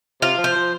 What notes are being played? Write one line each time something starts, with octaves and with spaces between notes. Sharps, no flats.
C3 F4
F3
C5
F3